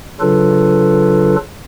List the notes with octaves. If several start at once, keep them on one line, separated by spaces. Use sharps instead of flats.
C#3 F#3 D4 F4 A4 B4